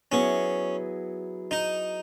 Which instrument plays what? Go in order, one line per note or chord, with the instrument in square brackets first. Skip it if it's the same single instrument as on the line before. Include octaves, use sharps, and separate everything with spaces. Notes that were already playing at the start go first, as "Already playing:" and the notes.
[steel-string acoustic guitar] F#3 B3 E4 G#4 [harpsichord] C#4
[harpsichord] D#4